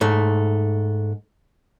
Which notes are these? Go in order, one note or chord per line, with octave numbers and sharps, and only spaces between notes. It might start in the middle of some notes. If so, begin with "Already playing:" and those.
G#2 A3